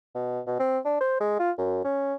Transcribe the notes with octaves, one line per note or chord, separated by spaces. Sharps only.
B2
B2
C4
D4
C5
G#3
F4
F#2
C#4